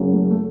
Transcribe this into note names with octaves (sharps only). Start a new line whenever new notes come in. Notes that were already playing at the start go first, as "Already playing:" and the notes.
Already playing: F#1 F#2 C#3 F#3
A3
A3